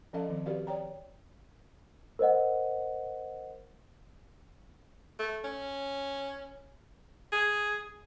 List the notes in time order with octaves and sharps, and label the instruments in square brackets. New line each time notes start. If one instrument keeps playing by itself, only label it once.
[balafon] F3 C#4 A4 D#5 F5 A5
D#3 F3 C4
F#4 G4 A#4 B4 D5 F5
C#5 D5 G5 A#5
[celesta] A#4 C5 D#5 F#5
[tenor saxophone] A3
C#4
G#4